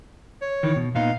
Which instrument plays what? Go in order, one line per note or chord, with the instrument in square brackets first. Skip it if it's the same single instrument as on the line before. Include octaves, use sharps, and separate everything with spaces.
[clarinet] C#5
[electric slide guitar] D#3 E3
B2
[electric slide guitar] A#2 B3 D#4 [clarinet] F5